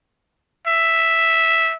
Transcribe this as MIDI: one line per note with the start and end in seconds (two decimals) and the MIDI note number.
0.67 1.75 76